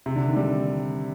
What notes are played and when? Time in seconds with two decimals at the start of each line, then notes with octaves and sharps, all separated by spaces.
0.06 C3
0.16 D3
0.26 D#3
0.36 G3